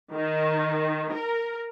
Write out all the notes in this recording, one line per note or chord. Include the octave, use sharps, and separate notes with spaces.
D#3
A#4